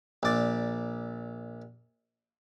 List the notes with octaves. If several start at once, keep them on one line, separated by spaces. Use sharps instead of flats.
A#1 D5